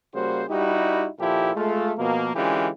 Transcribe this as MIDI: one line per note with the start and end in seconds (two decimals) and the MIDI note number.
0.14 0.42 49
0.14 0.42 55
0.14 0.42 58
0.14 0.42 66
0.14 0.42 72
0.49 1.07 43
0.49 1.07 55
0.49 1.07 63
0.49 1.07 64
0.49 1.07 66
0.49 1.07 67
1.19 1.50 39
1.19 1.50 46
1.19 1.50 53
1.19 1.50 64
1.19 1.50 67
1.19 1.50 69
1.55 1.92 56
1.55 1.92 57
1.55 1.92 65
1.98 2.34 47
1.98 2.34 53
1.98 2.34 58
2.36 2.68 50
2.36 2.68 52
2.36 2.68 56
2.36 2.68 61
2.36 2.68 65
2.36 2.68 67